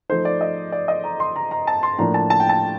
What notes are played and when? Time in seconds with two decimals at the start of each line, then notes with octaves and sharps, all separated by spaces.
0.09 F3 A3 D#4 C5
0.25 D5
0.41 D#5
0.72 D5
0.88 D#5
1.04 A#5
1.20 C6
1.36 A#5
1.51 A#5
1.67 A5
1.83 C6
1.99 A2 F3 A#3 D4 A#5
2.14 A5
2.30 A5
2.40 G5
2.49 A5